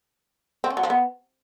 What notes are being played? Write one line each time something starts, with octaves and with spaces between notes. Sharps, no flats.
C4
C#4
F#3
F3
B3